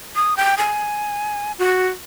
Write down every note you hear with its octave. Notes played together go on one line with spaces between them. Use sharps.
D#6
G5
G#5
F#4